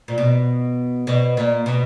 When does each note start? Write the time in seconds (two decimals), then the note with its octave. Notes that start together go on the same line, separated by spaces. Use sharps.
0.08 A#2
0.18 B2
1.07 B2
1.37 A#2
1.66 B2